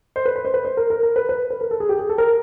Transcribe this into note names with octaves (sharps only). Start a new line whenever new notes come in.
C5
B4
B4
C5
B4
C5
A#4
A#4
A#4
B4
B4
B4
A#4
A4
G#4
G4
G#4
A4
A#4